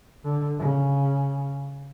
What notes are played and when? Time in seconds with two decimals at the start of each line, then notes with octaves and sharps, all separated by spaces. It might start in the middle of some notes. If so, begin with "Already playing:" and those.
0.25 D3
0.59 C#3